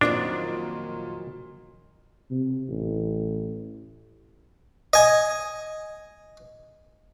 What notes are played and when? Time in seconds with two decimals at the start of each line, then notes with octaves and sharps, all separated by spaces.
0.01 F2 A#2 D#3 F#3 D4 D7
2.31 C3
2.69 A1
4.93 D#5 G#5